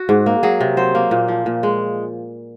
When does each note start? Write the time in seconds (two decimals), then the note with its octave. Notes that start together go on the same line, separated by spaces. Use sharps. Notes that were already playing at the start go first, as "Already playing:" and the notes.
Already playing: F#4
0.09 G#2
0.26 A#3
0.43 F#3 G#4
0.61 C3
0.77 F#3 C5
0.95 A#3
1.11 A#2
1.28 F3
1.46 A#2
1.63 G#3